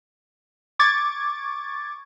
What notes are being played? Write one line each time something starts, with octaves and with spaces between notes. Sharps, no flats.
C#6 D6 G#6 A6